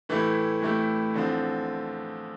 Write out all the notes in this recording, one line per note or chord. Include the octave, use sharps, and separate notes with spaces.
A2 E3 A3 E4 G4
A2 E3 A3 E4 G4
E2 D3 F3 C4